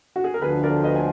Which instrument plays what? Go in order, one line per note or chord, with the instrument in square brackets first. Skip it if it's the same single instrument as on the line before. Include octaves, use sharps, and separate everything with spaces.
[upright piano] F#4
G#4
A#4
[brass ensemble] D2 D3 F3 [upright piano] G#4 B4
[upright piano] A#4 D5
B4 D#5
G#5